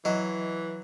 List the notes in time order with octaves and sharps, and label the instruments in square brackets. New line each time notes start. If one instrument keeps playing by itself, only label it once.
[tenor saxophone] E3 [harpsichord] F#3 [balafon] D#5